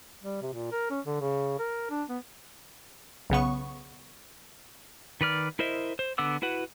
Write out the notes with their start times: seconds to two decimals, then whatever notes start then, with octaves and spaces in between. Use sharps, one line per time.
0.23 G3
0.42 C3
0.54 A#2
0.72 A#4
0.90 C#4
1.06 D3
1.21 C#3
1.59 A#4
1.90 D4
2.09 B3
3.30 B1 C#3 B3 C#6
5.21 D#3 B4 D5 F6
5.59 E4 A#4 C5 D#5 E5
5.99 C5
6.18 D3 B3 F#5 D6 E6
6.42 E4 F#4 B4 F#5